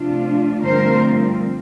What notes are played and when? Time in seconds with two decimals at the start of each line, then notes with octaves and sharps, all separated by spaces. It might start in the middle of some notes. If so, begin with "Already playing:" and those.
Already playing: C3 F3 A3 D4 F4
0.63 G2 D3 F3 A3 C4 A#4 C5